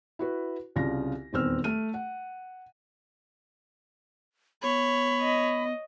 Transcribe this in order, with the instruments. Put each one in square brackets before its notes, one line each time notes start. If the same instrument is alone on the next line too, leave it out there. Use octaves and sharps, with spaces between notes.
[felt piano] E4 F#4 B4
C2 C#3 F4 A#6
D#1 E2 C4 E6 F6
A3 F6 D#7
F#5
[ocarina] B3 [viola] C#5 [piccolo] B5
[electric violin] D#5